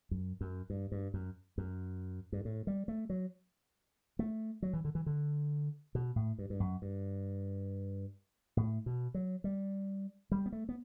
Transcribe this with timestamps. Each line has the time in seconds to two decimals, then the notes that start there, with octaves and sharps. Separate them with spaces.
0.11 F#2
0.41 F#2
0.70 G2
0.92 G2
1.14 F#2
1.58 F#2
2.32 G2
2.45 A2
2.67 G3
2.88 A3
3.10 F#3
4.19 A3
4.62 F#3
4.73 E3
4.85 D3
4.95 E3
5.06 D3
5.95 B2
6.16 A2
6.38 G2
6.50 G2
6.60 F#2
6.82 G2
8.57 A2
8.86 B2
9.14 F#3
9.44 G3
10.32 G3
10.46 B3
10.52 A3
10.69 B3